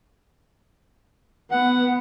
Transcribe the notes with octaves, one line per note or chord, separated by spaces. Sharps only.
B3 F#5